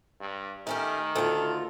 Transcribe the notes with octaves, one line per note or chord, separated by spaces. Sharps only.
G2
D#3 A3 C#4 G4
D2 F4 A4